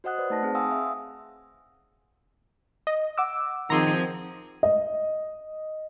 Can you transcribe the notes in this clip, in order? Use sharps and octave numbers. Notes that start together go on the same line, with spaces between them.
F#4 C5 D#5 F#5 D#6 F#6
B4 C5 D5
A3 D#4 A5 A#6
C4 G#4
F5 F#5 G#5 C6 D#6 E6
E5 F5
D#5
F#5 D6 E6
D#3 F3 C4 G#4 A#5 C6
D#5